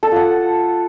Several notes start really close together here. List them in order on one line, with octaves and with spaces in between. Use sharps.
A4 A5 F4 F#5